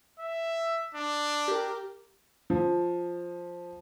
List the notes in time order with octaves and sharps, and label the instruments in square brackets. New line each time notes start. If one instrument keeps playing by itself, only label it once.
[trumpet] E5
D4
[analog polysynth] G4 A#4
[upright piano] F3